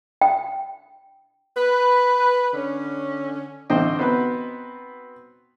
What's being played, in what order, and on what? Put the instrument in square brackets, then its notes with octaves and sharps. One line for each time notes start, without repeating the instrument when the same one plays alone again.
[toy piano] G5
[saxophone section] B4
D3 C#4
[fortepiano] A1 D3 C4 C5 D#5 G5
B3 C4 D#4 F#4 B4